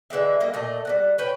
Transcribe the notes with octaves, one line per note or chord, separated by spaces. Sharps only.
D3 E3 G#3 E5
G3 A#3 D#5
A#2 A3 D#5
G3 C4 F#5
C#4 B4 G5